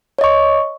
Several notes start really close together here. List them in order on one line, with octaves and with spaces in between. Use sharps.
C#5 D#5 C#6